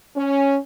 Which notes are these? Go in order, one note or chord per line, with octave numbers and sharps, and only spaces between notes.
C#4